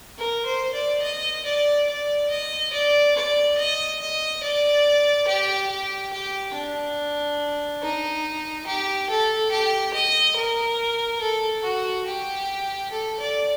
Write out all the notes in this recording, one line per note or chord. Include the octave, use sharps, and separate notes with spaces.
A#4
C5
D5
D#5
D5
D5
D#5
D5
D5
D#5
D#5
D5
G4
G4
G4
D4
D#4
G4
A4
G4
D#5
A#4
A4
F#4
G4
A4
D5